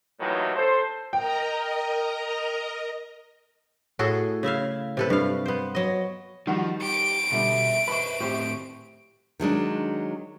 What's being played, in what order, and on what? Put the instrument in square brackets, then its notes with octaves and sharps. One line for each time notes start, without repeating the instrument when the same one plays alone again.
[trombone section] D#2 A2 D#3 E3 F#3
A4 C5
[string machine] A#4 D#5 A#5 [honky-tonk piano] G5
[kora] A2 F#4 G#4 A4
C#3 E4 E5 F5
C3 A4 B4
G2 F5
B3 C5
F#3 D#5
[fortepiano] D#3 G3 F#4 [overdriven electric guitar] F3
[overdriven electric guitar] G4 [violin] D7
[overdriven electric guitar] B2 [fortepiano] D3 G3 [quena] E5
[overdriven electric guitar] B4 C5 [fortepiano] B5 C#6
[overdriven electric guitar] A2 C4 [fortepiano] G4 C5 C#6
[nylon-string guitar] D#3 F#3 G#3 D4